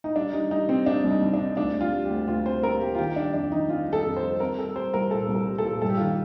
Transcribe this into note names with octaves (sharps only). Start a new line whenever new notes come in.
D#4
G3 D4
G3 D#4
G3 D#4
C3 C4
C4 D4
C2
D#4
C2
D4
C3
D2 D4
G3
F4
G3
G4
D2
D2 F4
C3 C5
A#3 A#4
A#3 G4
F4
D#3 G4
G3 D4
F2 D4
D#3 D#4
F2 F4
G3
A4
F2
C5
G3
C4 A#4
G3 A4
G3 C5
C2 A#4
A#2 A4
C2
A#4
G3
A4
A#2
G2 A4
G4
F4
D#3 G4